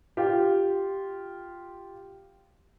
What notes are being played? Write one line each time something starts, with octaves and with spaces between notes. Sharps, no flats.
F4 G4